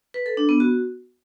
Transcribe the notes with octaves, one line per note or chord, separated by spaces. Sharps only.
B4
A4
D4
B3
F#4